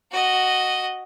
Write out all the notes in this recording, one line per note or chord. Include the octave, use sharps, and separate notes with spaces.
F#4 D#5